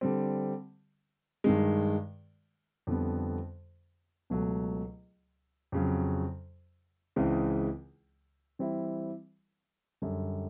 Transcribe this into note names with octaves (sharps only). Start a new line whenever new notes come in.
D3 G3 C4
G2 D#3 G#3
F2 D3 G3 B3
C#2 B2 F#3 A3
F2 C#3 F#3
C#2 C#3 E3 G#3 C4
E3 G3 C4 E4
F#2 D3 G3